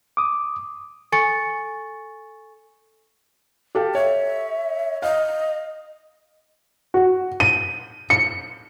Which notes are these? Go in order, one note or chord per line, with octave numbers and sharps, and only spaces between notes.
D6 D#6
A4 G#5 C#6 A6 C#7
G4 A4 F5
C#5 E5
D#5 F5
F#4
D#7
C#7